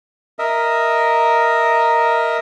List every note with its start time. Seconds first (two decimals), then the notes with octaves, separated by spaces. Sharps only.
0.39 A#4 D#5 E5